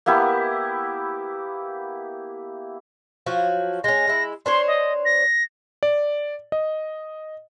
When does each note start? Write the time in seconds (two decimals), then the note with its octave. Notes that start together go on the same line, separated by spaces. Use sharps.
0.06 A#3 B3 E4 G4
3.26 F3 F#3 F#4
3.84 G#3 C#4 A#6
4.07 G#3 E4
4.46 D4 C5 C#5 C6
4.67 D#5
5.05 A#6
5.83 D5
6.52 D#5